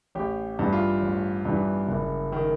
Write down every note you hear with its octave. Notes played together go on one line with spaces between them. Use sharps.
A1 G4
G2 E3
F4
A1
G2 E3
F#1
D#3